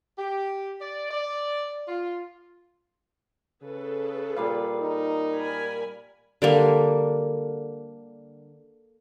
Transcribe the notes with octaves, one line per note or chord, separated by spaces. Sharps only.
G4
D5
D5
F4
C#3 G#4 A4 B4
A#2 G3 F5
D#4
A#4 G#5 B5
D3 G3 A#3